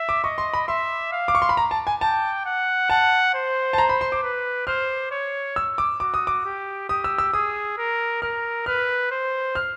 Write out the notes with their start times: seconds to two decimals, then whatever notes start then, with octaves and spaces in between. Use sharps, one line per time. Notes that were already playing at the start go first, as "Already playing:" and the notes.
Already playing: E5
0.09 D6
0.24 D#5 C#6
0.38 C6
0.54 B5
0.68 E5 C6
1.12 F5
1.28 D6
1.35 C#6
1.42 C6
1.49 B5
1.57 A#5
1.71 A5
1.87 G#5
2.01 G5 A5
2.46 F#5
2.90 F#5 A5
3.35 C5
3.73 A5
3.78 A#5
3.89 B5
4.01 C6
4.12 D6
4.23 B4
4.67 C5 F6
5.11 C#5
5.56 E6
5.78 D6
6.00 F#4 D6
6.14 D#6
6.27 D6
6.45 G4
6.89 G4 D#6
7.04 E6
7.18 E6
7.33 G#4 D#6
7.78 A#4
8.22 A#4 F6
8.66 B4 F6
9.11 C5
9.55 F6